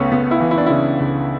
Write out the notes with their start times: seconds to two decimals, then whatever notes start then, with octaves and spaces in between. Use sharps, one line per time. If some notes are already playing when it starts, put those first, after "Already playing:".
Already playing: C#2 C#3 A3 B3 C#4
0.11 C#2 B3
0.31 E4
0.40 E3
0.51 E4
0.58 D4
0.66 C#3 E4
1.00 C#2